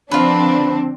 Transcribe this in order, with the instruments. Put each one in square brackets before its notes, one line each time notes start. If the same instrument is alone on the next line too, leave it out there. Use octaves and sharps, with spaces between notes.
[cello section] D3 F3 C4 [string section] D4 [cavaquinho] F4 B4